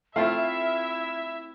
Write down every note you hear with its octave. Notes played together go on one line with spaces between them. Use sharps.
A3 C4 E4 F4 E5 F5